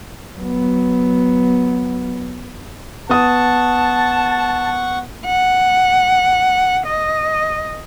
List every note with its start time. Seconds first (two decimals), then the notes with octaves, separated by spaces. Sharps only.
0.39 F#3 B3
3.09 B3 F#5 A5 C#6 D#6
5.25 F#5
6.87 D#5